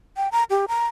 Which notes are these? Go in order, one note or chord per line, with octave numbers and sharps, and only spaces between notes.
G5
A#5
G4
A#5